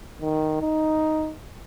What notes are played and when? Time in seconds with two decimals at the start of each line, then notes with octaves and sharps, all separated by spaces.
0.22 D#3
0.62 D#4